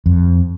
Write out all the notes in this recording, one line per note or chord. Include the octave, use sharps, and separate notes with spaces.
F2